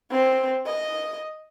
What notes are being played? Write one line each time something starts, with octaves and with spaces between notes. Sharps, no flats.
C4
D#5